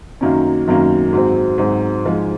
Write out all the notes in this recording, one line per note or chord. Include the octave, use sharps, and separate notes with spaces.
F#2 D#3 F#3 A#3 C#4
F#2 D#3 F#3 A#3 C#4
G#2 F#3 C4
G#2 F#3 C4
G#2 F3 G#3